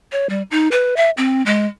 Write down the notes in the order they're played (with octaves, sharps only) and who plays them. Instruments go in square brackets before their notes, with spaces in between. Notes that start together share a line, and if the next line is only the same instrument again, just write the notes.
[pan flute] C#5
G3
D#4
B4
E5
C4
G#3